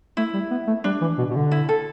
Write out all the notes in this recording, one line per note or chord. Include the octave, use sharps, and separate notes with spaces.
A3 E4
G3
B3
A3
G3 D4
E3
B2
B2
D3
E4
A4